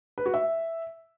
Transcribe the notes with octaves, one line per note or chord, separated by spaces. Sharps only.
B4
F#4
E5